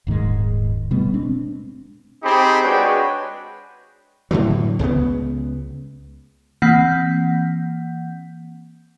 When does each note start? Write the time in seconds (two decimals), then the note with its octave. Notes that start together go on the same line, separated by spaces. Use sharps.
0.07 D#1 G#2 D#3 G#3
0.91 B2 G3 A3 B3
1.14 G#3 C4 D4
2.23 C4 D#4 G4 G#4 B5
2.63 G#3 D4 F#4 B4 C#5 G5
4.31 A2 D3 E3 F#3
4.79 C#2 C#3 F3 B3
6.62 E3 A#3 C4 F#5 G6 B6